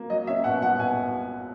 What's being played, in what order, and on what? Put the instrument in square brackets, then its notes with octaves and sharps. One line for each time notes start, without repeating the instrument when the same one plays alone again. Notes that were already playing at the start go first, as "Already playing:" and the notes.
Already playing: [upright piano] A#3
F#3 D#5
C#4 E5
B2 F#5
B1 F#5
B2 G#5